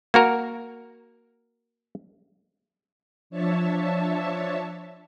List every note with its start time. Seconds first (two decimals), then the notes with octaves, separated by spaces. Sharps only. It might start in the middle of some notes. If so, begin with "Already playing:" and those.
0.14 A#3 F#4 A#4
3.30 F3 D4 C#5 E5 A5